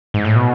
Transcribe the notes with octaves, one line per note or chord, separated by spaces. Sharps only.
G#2
A2
B2